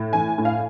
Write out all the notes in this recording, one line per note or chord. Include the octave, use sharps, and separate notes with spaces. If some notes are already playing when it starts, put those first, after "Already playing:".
Already playing: A2
E3 G#5
A2
F5